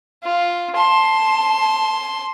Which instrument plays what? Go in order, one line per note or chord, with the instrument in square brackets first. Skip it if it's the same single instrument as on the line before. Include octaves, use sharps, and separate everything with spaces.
[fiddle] F4
[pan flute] A5 [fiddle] C6